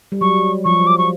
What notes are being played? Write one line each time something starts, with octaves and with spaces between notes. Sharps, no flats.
G3
F#3 C#6
F3 C#6
D6
C#6